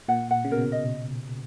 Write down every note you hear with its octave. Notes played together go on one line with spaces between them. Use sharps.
A#2 F#5
F#5
C#3
B2 A#4
D#5